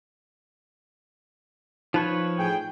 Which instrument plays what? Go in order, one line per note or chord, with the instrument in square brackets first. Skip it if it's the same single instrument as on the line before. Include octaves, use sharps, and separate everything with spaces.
[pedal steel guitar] F3 B4 C#5 [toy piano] D#4
[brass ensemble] A2 G#4 G5